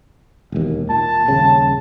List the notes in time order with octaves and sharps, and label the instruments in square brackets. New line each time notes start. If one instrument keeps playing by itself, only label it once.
[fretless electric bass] E1 D#2
[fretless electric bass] A#2 [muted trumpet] A5
[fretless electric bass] D#1 C#3